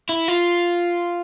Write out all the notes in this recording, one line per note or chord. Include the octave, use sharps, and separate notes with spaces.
E4
F4